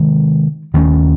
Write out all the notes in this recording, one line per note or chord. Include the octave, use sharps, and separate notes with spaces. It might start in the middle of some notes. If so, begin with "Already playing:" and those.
Already playing: C3 D#3 G#3
D#2 D#3 A3 C#4